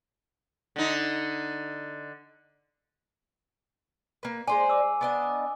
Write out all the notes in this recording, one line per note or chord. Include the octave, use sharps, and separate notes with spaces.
D3 D#4
A#3 B4
G#3 C5 D5 G#5
D6 E6
B3 D4 D#5